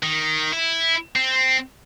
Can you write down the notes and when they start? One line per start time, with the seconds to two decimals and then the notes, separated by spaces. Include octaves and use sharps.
0.03 D#3
0.52 E4
1.15 C4